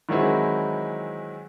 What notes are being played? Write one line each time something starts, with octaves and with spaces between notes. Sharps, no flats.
D#3 E3 F#3 G#3 C4 E4